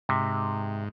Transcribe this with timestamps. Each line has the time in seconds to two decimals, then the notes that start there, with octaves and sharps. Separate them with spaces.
0.09 G#2 C3